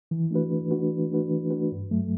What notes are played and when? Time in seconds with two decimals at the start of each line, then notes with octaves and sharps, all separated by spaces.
0.11 E3
0.31 A3 D4 F#4 B4
0.50 E3
0.71 A3 D4 F#4 B4
0.91 E3
1.11 A3 D4 F#4 B4
1.30 E3
1.51 A3 D4 F#4 B4
1.72 G2
1.91 F#3 A3